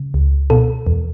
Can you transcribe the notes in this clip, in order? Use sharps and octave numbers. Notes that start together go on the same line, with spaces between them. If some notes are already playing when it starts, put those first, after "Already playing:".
Already playing: C#3
C#2
B2 A4
E2